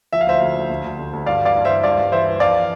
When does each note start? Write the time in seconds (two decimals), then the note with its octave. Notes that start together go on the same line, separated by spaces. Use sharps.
0.13 F3 E5
0.21 F5
0.27 D2 C5 E5
0.41 D2
0.56 D2
0.70 D2
0.84 D2
0.99 D2
1.13 D2
1.26 G2 D5 F5
1.41 E3 D5 F5
1.56 G2
1.65 E3 C5 E5
1.84 G2 D5 F5
1.98 G2
2.12 E3 C5 E5
2.26 E3
2.40 F2 D5 F5